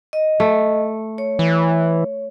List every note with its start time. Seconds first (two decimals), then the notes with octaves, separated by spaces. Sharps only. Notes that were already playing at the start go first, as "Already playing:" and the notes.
0.13 D#5
0.40 A3
1.18 C#5
1.39 E3